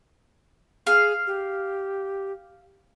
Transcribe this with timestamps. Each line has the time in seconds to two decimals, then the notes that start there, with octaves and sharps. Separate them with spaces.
0.87 G#4 F5
1.27 G4